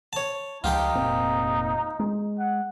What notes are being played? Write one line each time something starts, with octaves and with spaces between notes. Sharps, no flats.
C#5 A5
C#2 F3 D#4 F4 G4 G5
F1 A#2 C4
G#3
F#5